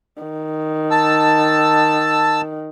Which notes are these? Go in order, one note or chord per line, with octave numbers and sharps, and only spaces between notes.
D#3
A5 E6